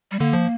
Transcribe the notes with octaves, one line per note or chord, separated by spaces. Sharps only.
G3
D3 A#3
F3